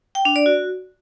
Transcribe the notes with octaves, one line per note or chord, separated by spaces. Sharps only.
G5
D4
D5
F#4